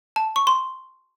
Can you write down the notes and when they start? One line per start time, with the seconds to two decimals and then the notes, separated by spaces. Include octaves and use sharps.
0.16 A5
0.36 C#6
0.47 C6